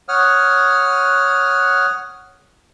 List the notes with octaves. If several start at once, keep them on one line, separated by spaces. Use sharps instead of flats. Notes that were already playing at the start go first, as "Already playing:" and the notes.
C#5 F#5 D#6 F6